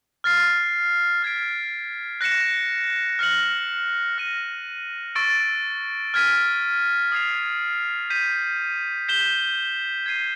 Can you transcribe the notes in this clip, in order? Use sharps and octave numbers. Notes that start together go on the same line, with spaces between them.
F6 A6 C7
F6 G#6 B6 D7
F#6 A#6 C#7 E7
F6 A#6 C#7 F#7
F6 A#6 D#7
C#6 E6 A6 D7
F6 G#6 B6 D#7
D#6 G#6 C7 F7
G6 B6 D#7
G6 B6 E7 G7
G#6 C7 D#7